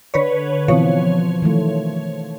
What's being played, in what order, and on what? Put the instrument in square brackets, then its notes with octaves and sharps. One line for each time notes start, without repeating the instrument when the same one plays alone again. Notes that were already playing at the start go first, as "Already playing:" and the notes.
[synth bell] D3 B4 C#5
[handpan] B2 E3 C4 [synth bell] F3 C#5
[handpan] D#3 E3 A3